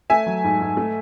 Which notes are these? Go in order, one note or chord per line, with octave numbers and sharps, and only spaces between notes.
A3 E5 G#5
F#3
G#2
G#2
A3